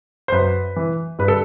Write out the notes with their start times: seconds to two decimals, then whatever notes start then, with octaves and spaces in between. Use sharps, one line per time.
0.28 C5
0.32 F#2 B4
0.76 E3
1.19 G2 B4
1.28 A4